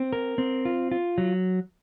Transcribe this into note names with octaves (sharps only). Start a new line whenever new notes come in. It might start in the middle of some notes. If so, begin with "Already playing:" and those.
Already playing: C4
A#4
C4
F4
F4
F#3